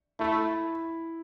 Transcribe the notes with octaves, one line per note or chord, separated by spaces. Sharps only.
A3 E4